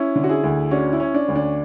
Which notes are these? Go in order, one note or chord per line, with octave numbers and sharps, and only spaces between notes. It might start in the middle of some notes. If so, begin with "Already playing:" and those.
Already playing: C#4 E4
D3
F#4
E4 G#4
D2
C#4 D4 F#4
E4
C#4
D4
D2
D4